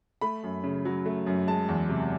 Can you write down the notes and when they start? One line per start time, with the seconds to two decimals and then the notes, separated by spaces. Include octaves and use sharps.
0.21 A3 B5
0.44 F#2
0.63 C#3
0.85 F#3
1.06 A3
1.27 F#2
1.47 G#3 A5
1.68 E2
1.89 C3